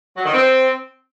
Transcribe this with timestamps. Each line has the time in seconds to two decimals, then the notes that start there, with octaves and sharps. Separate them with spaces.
0.17 F#3
0.25 D#3
0.34 C4